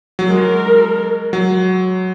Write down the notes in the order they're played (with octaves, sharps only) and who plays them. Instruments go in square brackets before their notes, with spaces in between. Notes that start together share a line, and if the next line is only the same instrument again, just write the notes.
[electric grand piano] F#3
[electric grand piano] G#3 [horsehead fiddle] A#4
[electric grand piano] F#3